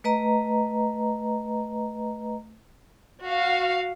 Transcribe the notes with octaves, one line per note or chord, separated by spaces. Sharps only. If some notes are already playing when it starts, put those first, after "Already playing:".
A3 B4 D#5 A#5
F#4 F5